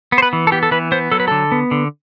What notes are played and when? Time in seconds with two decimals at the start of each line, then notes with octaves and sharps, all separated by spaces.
0.12 B3
0.18 C5
0.22 B4
0.33 E3
0.47 A4
0.52 B3 G4
0.63 A4
0.71 E3 B4
0.92 B3 C5
1.12 F#3 A4
1.20 B4
1.28 D3 A4
1.52 B3
1.71 D3